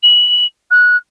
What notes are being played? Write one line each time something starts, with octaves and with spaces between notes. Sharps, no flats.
F#7
F#6